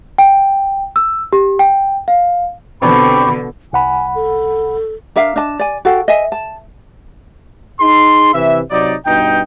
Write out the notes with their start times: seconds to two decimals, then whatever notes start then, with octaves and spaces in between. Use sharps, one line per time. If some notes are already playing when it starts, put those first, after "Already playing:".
0.18 G5
0.96 E6
1.33 G4
1.59 G5
2.08 F5
2.82 B2 D3 C4 D4 G4 B5 C#6
3.73 C2 F#5 G#5 B5
4.15 A4
5.16 D4 A#4 E5 F5
5.36 D4 D#5 A5
5.59 D5 G#5
5.85 F#4 A4 F5 G5
6.08 D#5 E5 G#5
6.32 A5
7.79 D#4 G#4 C6
8.33 C3 E3 E5
8.71 C3 F#3 D#4 D5
9.05 G2 B2 D#4 G5